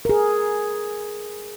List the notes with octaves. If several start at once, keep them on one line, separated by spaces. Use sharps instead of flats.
G#4 A#4